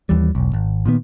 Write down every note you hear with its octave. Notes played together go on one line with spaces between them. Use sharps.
D#2 E3 G3
E1 B1
G#1
A#2 D#3 B3